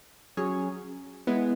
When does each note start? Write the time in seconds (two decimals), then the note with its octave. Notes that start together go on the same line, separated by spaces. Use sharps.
0.37 F#3 C#4 G#4 C#5
1.27 G#3 B3 E4